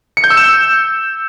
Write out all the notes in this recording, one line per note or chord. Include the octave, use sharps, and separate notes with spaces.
C#7
G6
E6
E7